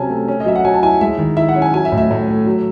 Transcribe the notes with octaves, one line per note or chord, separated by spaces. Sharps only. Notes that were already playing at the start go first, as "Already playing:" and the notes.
Already playing: C3 F#3 C#4 G#5 A5
A3
C#4
D#5
F#3 E5
F#5
F#3 G#5
A5
E4 G#5
G#3 E5
D#3
E4 E5
F#5
C#4
G#5
F#3 G#5
E5
A2
E5
A2
A3
F#3